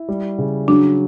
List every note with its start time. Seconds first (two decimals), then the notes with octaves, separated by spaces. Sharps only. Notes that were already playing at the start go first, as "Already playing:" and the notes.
Already playing: E4
0.09 G3
0.38 C#3
0.68 F#3 D4